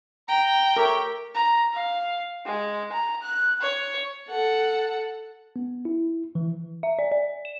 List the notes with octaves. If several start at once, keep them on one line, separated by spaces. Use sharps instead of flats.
G5 A#5
A3 G4 A#4 C#5
A#5
F5
G#3
A#5
F#6
C#5
A4 F#5
B3
E4
E3
E5
D5
D5
E7